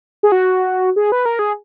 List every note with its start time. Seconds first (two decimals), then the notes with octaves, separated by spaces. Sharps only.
0.23 G#4
0.32 F#4
0.96 G#4
1.12 B4
1.26 A#4
1.39 G#4